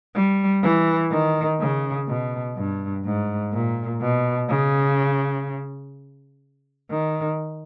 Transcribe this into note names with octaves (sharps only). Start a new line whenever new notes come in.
G3
E3
D#3
C#3
B2
G2
G#2
A#2
B2
C#3
D#3